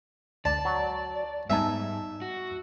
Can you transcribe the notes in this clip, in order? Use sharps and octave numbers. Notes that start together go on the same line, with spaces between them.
D2 D4 D5 A5
F#3
G#2 G3 B3 D#4 E5 G#5 A5
F#4